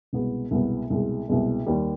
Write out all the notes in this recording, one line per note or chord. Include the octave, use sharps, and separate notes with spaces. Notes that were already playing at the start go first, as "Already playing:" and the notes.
C2 B2 G#3 B3
C2 B2 G#3 B3
C2 B2 G#3
C2 B2 G#3
D#2 D#3 G3